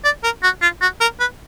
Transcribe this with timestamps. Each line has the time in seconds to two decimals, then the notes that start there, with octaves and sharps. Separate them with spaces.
0.04 D5
0.24 A#4
0.43 F#4
0.62 F4
0.81 F#4
1.01 A#4
1.20 B4